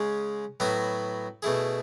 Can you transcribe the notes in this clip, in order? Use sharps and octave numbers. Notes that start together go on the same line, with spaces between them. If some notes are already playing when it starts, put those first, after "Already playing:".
Already playing: C#3 G#3 C#4 G#4
A2 F#3 B3 F#4
B2 A3 E4 G#4